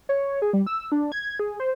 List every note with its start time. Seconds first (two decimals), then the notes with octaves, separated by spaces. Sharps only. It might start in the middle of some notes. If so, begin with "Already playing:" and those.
0.09 C#5
0.42 G#4
0.53 G3
0.67 E6
0.92 D4
1.12 G#6
1.39 G#4
1.60 C5